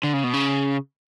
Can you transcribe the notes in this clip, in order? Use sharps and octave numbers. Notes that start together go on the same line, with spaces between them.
D3
C#3
B2
C#3